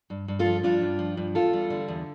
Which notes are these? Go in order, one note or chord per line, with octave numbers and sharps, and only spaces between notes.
G2
G2
F4 A4
F3
G2 D4 F4
G2
F3
G2
E2 F4 A4
G3
D3
E2